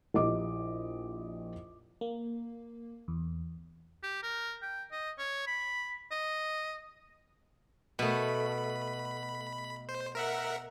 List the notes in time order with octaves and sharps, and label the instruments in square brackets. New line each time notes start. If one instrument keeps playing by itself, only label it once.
[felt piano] A#1 E4 G4 D#5 D6
[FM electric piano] A#3
E2
[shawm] G4
A#4
G5
D#5
C#5
B5
D#5
[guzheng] B2 A3 [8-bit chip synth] B5
[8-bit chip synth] C5
A#4 E5 F#5